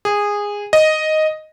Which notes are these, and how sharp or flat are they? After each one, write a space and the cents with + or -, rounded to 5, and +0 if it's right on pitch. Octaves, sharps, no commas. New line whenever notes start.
G#4 -15
D#5 +0